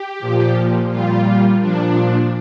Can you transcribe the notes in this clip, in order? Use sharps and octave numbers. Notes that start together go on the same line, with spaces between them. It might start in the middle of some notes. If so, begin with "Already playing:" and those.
Already playing: G4
A#2 F3
A#2 G3 F4
A#2 F3 D4